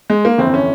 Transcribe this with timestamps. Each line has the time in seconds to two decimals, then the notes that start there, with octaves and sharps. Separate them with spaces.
0.10 G#3
0.25 A#3
0.38 G1 F2 E3 C4
0.54 C#4